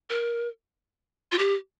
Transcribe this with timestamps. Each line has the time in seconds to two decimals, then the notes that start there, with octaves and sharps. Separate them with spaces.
0.10 A#4
1.32 F4
1.39 G4